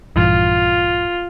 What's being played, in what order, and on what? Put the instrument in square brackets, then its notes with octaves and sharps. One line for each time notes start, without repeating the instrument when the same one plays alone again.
[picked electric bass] A#1 G2 E3 [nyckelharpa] F4